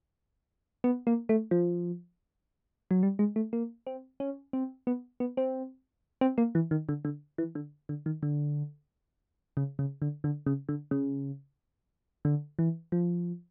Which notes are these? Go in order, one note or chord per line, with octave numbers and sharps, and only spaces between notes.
B3
A#3
A3
F3
F#3
G3
G#3
A3
A#3
C4
C#4
C4
B3
B3
C4
C4
A#3
E3
D#3
D3
D3
E3
D3
D3
D#3
D3
C#3
C#3
D3
D3
C#3
D3
C#3
D3
E3
F3